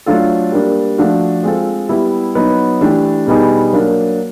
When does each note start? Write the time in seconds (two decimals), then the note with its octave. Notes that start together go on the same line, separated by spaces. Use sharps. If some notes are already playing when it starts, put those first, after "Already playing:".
0.06 F#3 A3 D4 F4 A4
0.52 G3 A#3 D4
0.98 F3 A3 D4 F#4
1.44 G#3 C4 F4 A4
1.89 G3 B3 E4 G4
2.35 F#3 B3 D#4
2.81 E3 A3 D4 G4
3.27 B2 G3 B3 D#4 G#4
3.73 F#3 A#3 D4